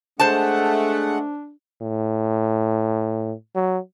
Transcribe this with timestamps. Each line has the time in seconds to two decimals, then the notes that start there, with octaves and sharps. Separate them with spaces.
0.20 G#3 A3 D4 C5 F#5 A5
1.81 A2
3.55 F#3